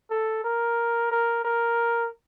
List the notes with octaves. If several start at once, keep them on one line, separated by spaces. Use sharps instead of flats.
A4
A#4
A#4
A#4